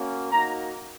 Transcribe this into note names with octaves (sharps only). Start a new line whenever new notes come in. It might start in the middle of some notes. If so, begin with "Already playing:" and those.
Already playing: A#3 C#4 F#4
A#3 D#4 F#4 A#5